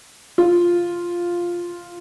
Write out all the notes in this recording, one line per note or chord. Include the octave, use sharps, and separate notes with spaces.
F4